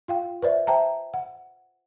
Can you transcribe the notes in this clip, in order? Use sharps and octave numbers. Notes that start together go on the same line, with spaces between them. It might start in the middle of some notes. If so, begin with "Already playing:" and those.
F4 F5 G5
B4 C5 D5 E5
C5 E5 G5 A5 A#5
F#5